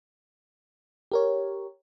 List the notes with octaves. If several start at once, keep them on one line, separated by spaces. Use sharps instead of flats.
G4 A#4 C#5